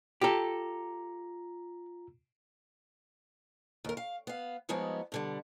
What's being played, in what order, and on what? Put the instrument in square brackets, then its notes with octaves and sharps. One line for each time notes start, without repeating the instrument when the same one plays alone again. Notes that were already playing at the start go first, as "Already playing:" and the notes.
[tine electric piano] F4 A#5 [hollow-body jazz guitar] G4 A4
[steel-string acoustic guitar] D#2 A#4
F5
B3 F5
F3 G3 G#3 B3 D#4 C#5
B2 D3 G3